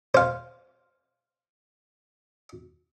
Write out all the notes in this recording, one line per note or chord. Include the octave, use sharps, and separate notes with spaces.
C5 F5